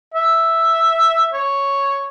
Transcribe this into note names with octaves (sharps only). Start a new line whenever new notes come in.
E5
C#5